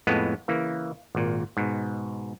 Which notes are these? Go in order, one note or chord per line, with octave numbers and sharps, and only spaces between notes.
F2 A2 G#3 B3
C#3 E3 A#3
G#1 A#2
G#2 B2